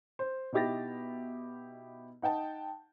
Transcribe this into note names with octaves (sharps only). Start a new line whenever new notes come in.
C5
B2 D#4 E4 G4 A6 A#6
D#4 F#5 G5 A5